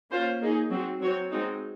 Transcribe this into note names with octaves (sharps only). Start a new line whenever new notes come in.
A#3 C#4 F4 C5
A#3 D#4 G#4
F#3 C4 F#4
F#3 C4 F#4 C#5
G#3 C4 D#4 F#4